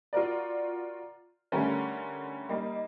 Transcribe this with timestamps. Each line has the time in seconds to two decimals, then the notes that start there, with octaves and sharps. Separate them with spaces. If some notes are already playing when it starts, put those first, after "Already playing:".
0.13 F4 F#4 A#4 D5
1.52 D3 G3 A3 C#4 A#4
2.49 G3 A#3 D#4